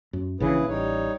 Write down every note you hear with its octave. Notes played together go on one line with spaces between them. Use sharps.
F#2
A#1 C#3 E3 E4 G#4 B4
A1 G3 D#4 C#5